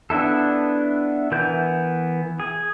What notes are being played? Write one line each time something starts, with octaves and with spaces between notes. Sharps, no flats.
B3 D4 E4 A4
E3 B3 A#4 G6
G#4